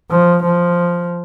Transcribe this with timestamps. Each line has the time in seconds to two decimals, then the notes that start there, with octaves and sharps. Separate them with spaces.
0.10 F3
0.43 F3